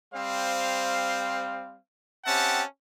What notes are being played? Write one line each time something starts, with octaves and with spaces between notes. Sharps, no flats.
G3 C4 C5 F5
C4 C#4 G4 E5 F#5 A5